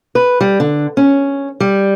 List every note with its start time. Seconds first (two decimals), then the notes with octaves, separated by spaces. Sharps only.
0.15 B4
0.41 G3
0.60 D3
0.97 C#4
1.60 G3